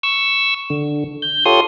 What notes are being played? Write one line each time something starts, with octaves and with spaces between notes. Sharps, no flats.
C#6 E6
D3
G6
F4 G4 A4 C#5 C6 D#6